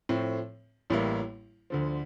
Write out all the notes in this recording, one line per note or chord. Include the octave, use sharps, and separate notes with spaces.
A2 F3 A3 C4
A1 A2 G3 A#3 E4
D2 D3 F3